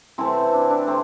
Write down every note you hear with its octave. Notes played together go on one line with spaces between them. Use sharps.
C3 E3 A3 C4 E4
D4
E4
D4
C3 A3 C4